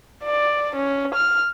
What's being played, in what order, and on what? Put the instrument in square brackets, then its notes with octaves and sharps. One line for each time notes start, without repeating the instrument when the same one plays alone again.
[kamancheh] D5
C#4
F6